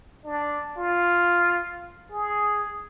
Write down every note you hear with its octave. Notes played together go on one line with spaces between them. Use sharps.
D4
F4
G#4